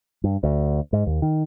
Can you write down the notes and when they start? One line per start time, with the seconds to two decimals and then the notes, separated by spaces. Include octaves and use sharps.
0.24 G2
0.43 D2
0.93 G#2
1.07 D#2
1.22 D#3